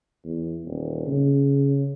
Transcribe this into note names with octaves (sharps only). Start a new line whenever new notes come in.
E2
D#1
C#3